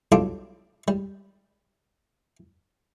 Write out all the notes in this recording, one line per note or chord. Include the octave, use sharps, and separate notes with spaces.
B1 G3 F4 A4 D6
G3